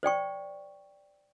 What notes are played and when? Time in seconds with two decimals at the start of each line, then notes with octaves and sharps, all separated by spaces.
0.03 C5 D5 G5 C#6